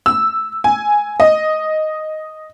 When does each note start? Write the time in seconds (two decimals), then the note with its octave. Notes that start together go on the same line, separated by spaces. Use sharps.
0.06 E6
0.64 G#5
1.20 D#5